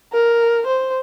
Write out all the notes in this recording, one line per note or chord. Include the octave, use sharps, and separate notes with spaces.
A#4
C5